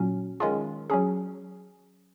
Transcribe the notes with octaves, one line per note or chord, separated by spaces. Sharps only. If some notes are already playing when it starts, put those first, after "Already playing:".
Already playing: A#2 F#3 C#4 F#4
D#3 G#3 C#4 F4 G#4
F#3 C#4 G#4